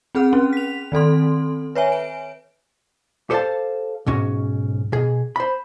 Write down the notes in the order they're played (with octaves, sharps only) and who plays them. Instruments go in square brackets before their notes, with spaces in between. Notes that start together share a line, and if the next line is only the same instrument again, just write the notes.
[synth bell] C4 G#4 F#5 F6
C#4
B6 F7
D#3 C4 A4 C6
B4 C#5 E5 G#5
D7
[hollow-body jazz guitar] G4 A4 C5 E5 F5 A5
B1 G#2 C#4 F#4
B2 G#4
C5 B5